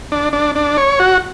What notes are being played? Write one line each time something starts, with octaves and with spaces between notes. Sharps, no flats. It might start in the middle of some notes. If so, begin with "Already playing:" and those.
D4
D4
D4
C#5
F#4